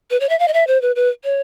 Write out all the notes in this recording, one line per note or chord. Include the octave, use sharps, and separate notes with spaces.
B4
C#5
E5
F5
D#5
E5
C5
B4
B4
C#5